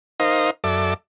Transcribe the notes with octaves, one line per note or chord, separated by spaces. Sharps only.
D#4 A#4 C5 D#5 F5
F#2 A4 D5 E5 D6